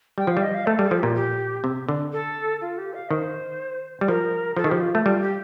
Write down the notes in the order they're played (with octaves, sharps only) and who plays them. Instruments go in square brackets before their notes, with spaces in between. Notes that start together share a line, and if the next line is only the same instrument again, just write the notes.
[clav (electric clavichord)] G3 [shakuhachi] G5
[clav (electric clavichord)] F3 [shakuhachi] F5
[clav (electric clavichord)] G3
[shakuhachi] D#5
F5
[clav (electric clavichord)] A3 [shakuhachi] A4
[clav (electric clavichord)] G3 [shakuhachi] A4
[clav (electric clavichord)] F3
[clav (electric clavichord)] A#2 [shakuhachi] G4
[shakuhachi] G4
[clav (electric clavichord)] C3
D3
[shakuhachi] A4
F4
G4
F5
[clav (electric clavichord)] D#3 [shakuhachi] C5
[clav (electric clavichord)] G3
[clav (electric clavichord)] F3 [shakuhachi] A#4
[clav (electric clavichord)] F3 [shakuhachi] A4
[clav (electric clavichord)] D#3
[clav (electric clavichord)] F3 [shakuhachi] G4
[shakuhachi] F4
[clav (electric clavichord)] A3
[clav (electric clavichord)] G3 [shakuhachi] F4
[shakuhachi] G4